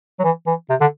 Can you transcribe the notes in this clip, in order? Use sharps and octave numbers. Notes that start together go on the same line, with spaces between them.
F#3
E3
E3
C3
D3